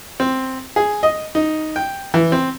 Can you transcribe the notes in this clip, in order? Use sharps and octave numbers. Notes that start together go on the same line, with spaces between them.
C4
G#4
D#5
D#4
G5
E3
C4